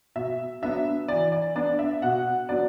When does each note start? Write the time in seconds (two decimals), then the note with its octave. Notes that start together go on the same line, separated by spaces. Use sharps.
0.16 B2 E5
0.62 F#3 B3 D4 E5
1.08 E3 D5
1.32 D5
1.56 B3 D4 D5
1.79 E5
2.02 B2 F#5
2.49 F#3 B3 D4 D5